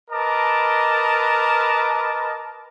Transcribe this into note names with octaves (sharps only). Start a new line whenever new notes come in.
A#4 B4 D#5 A5 D6